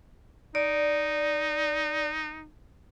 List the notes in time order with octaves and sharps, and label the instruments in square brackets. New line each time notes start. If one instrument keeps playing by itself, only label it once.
[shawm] D#4 [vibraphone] D5